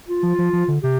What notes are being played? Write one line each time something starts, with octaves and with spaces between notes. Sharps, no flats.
F4
F3
F3
F3
D3
C3 G4